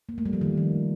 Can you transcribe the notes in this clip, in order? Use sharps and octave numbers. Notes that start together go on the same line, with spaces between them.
A#3
A3
G3
F3
D#3
F3